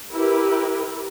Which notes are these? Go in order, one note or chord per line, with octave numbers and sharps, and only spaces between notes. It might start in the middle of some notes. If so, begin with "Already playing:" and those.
E4 G4 A#4 B4